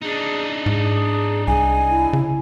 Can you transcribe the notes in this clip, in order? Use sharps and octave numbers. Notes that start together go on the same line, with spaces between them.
D4 D#4 G#4
G#2 G#4
C2 G#4 G#5
E4
C#3